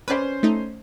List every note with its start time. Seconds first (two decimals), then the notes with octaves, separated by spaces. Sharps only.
0.08 C#4 B4 C5 D5
0.43 A3 D#4